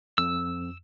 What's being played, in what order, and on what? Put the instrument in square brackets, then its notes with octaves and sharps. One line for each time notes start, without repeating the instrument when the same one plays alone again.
[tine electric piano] F2 [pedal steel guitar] E6